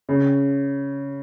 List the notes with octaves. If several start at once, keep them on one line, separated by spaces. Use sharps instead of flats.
C#3